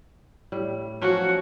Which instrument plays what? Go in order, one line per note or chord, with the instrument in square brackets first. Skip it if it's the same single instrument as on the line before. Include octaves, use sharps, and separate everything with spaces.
[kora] A2 G3
[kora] F3 F#3 C#4 [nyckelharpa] F#4